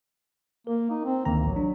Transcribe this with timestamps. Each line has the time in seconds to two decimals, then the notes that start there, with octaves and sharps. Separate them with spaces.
0.67 A#3 A#4
0.90 D#4
1.05 C4
1.25 D2 D#3 A#3 A#5
1.43 A1 F#3
1.56 D4